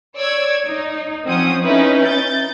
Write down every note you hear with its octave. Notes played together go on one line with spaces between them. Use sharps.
C#5 D5 E6 G#6
D#4
F3 C4 C#4 F#5 D#6
C#4 D#4 E4 B4
G6 A6